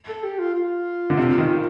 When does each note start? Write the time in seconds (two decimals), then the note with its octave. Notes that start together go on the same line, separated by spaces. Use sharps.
0.09 A4
0.24 G4
0.39 F4
0.54 F4
1.10 D3
1.17 C3
1.38 D#3